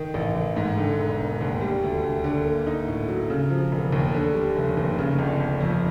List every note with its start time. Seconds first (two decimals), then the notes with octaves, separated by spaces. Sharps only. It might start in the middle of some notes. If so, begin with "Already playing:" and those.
Already playing: D#3
0.14 A1
0.35 A1
0.56 G#2
0.78 D3
0.99 E1
1.20 E1
1.41 D#2
1.61 G3
1.83 D2
2.03 D2
2.24 D3
2.46 A#3
2.67 D#4
2.88 A2
3.08 F#3
3.30 C#3
3.50 F3
3.72 E1
3.93 D#2
4.14 D3
4.34 G3
4.56 F1
4.77 D#2
4.99 C#3
5.19 G1
5.40 G1
5.60 F2